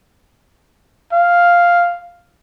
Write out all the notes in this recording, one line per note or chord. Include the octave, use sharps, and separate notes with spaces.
F5